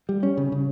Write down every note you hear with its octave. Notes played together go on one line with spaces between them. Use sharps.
G3
C#4
C#3
C#3